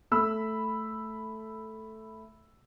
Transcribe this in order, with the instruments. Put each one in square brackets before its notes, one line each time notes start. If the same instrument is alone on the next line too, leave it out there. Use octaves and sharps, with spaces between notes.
[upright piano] A3 B5 E6